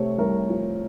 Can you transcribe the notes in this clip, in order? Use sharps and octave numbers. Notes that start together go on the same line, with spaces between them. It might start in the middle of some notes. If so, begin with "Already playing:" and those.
Already playing: C3 A3 C5 C#5
C2 A#4
F3